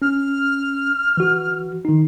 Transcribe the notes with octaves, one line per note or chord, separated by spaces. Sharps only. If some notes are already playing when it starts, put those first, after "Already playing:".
C#4 F6
E3 F#4
D#3 D#4